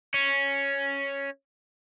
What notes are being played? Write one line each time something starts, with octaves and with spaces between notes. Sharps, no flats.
C#4